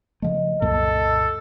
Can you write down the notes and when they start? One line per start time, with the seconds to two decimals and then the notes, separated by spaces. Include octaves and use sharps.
0.22 C#3 F3 A3 D#5
0.62 C2 F#2 A#2 A4